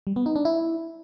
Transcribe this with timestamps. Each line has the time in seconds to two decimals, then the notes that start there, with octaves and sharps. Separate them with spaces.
0.07 G3
0.16 B3
0.26 D#4
0.36 D4
0.45 E4